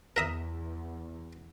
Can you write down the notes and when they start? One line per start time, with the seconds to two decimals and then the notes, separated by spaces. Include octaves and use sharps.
0.16 E2 A#4 E5 D#6